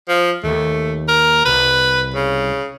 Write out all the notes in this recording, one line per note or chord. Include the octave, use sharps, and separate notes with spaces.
F3
D#2 A3
A#4
C2 B4
C#3